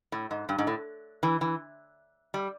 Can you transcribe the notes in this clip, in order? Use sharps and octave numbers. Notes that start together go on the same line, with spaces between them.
A2
G#2
G2
G#2
A2
E3
E3
G3